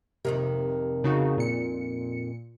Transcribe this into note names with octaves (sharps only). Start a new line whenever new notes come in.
F2 C3 D#3 A#3
C#3 D#4 F#4
A#2 C#7